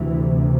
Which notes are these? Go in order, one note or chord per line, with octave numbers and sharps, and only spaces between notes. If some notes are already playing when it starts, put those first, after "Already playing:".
Already playing: D2 C3 E3